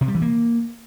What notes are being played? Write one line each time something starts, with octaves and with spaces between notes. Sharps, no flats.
C3
G3
E3
A#3